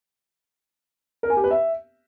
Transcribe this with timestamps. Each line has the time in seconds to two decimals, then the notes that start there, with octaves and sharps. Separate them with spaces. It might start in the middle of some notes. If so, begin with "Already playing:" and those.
1.23 A#4
1.30 G#5
1.37 G4
1.44 B4
1.51 E5